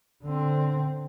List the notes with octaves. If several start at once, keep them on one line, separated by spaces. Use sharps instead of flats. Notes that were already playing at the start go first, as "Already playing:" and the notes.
D3 C4